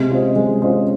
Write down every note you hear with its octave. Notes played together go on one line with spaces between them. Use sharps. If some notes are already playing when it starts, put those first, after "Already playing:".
Already playing: C3 G#3
C#4 F4 C5 D#5
G#3
C#4 F4 C5 D#5